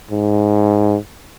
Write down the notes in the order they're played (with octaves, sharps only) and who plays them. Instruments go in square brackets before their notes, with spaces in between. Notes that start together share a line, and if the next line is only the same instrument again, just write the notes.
[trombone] G#2